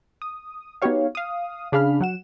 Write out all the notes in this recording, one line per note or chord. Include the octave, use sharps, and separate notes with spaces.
D#6
B3 D#4 F#4 G4 C#5 F5
F5 D#6
C#3 D4 G#4 F5 B5 F6
F#3 F#5 E7